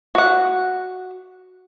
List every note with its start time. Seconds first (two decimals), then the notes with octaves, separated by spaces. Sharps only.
0.15 F#4 F#5